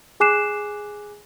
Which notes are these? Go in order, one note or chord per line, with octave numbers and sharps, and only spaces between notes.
G#4 G#5 D6 F#6 C7 E7